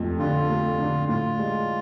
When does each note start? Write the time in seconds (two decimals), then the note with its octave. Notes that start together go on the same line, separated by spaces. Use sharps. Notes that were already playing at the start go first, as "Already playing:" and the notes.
Already playing: F2 A3
0.19 D3 F4
0.48 A3
0.79 D3
1.08 A2 F4
1.39 G#3